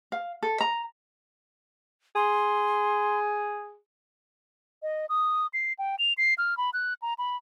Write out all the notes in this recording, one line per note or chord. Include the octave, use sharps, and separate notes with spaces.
F5
A4
A#5
G#4 C6
D#5
D#6
C7
G5
F7
C7
F6
B5
F#6
A#5
B5